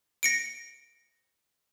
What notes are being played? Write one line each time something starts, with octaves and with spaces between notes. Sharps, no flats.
A#6 C#7 D7